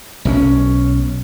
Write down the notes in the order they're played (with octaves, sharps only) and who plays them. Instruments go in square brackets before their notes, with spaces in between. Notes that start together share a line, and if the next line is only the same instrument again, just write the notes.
[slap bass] B1 E3 C#4